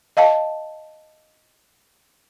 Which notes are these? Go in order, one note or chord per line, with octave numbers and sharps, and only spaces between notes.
D#5 F5 A5